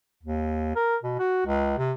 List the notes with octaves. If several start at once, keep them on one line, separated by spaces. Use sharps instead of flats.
D#2
A#4
B2
F#4
C#2
C3